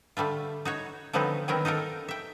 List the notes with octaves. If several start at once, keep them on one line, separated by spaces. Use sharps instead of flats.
D3 G3 A3 F4
D#4 F#4 C#5
D3 F3 F#3 B3 C4 D#4
D#3 F#3 B3 C4 A#4
D#4 F4 A4 A#4
E5 G5